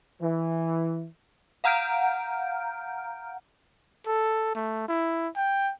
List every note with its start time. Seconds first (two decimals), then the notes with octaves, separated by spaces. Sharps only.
0.21 E3
1.64 F5 F#5 A#5 F6 G6 D7
4.06 A4
4.55 A3
4.88 E4
5.36 G5